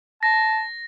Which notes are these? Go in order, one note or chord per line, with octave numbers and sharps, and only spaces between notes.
A5 A#6